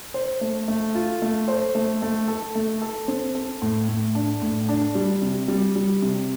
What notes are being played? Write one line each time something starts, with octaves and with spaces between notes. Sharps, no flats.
C5
A3
A3
F4
A3
C5
A3
A3
A4
A3
A4
C4
A4
A2
A2
D4
A2
D4
G3
C3
G3
G3
C3